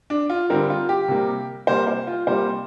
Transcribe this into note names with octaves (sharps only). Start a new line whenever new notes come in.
D4
F4
D3 G3 C4 A#4
F4
G4
C3 G3 A#3
C3 G3 A#3 C5
C5
F4
C3 G3 A#3 C5